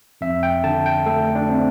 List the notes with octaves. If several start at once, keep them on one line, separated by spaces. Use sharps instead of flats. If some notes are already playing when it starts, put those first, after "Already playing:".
F2 E5
G5
D3 A5
G5
A3 A4
D4
C4